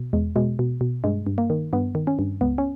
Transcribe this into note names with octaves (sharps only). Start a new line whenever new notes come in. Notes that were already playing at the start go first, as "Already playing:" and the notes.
Already playing: B2
E2 G#3
B2 G#3
B2
B2
G2 G#3
G2
A#3
D#3
G2 B3
D#3
C#4
G2
C#2 B3
C#4